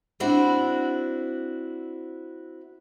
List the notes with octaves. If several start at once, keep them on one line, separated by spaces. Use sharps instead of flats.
C4 D4 E4 F#4